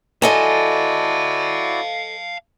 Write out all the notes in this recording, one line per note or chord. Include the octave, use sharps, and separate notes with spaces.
E4 F#4 A4 D5 D#5 F5 G#5 A5